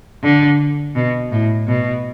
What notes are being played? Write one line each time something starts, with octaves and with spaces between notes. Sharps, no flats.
D3
B2
A2
B2